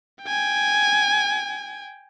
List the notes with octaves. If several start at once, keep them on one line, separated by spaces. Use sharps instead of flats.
G5 G#5